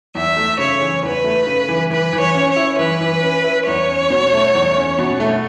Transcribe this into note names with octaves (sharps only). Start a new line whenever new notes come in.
E2 E5
A3
C#3 C#5
E3
E2 B4
A3
C#3
E3
E3 B4
E3
C#5
C#4
C#5
E4
E3 B4
E3
C#4
E4
E2 C#5
C#4
B2
A3
E2
C#4
B2
A3